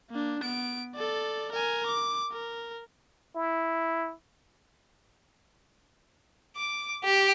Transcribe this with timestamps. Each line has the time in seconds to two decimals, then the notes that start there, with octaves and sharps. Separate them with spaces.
0.10 A#3 D4
0.42 B3 D7
0.95 A4 D5
1.52 A#4 G#5
1.86 D6
2.32 A#4
3.36 E4
6.56 D6
7.04 G4